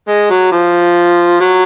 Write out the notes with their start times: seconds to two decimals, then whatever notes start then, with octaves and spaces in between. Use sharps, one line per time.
0.08 G#3
0.30 F#3
0.52 F3
1.40 F#3